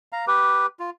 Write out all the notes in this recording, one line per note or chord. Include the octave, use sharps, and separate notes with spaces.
F5 A#5
G4 B4
F4